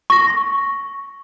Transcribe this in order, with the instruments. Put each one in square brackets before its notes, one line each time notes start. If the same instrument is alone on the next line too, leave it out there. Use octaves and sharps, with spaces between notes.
[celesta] C#6 A#6